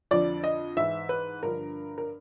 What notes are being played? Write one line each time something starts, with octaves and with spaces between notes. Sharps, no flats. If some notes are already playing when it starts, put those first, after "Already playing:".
F2 D3 F3 D5
D#5
G#2 E3 E5
B4
G2 D3 F3 A#4
A#4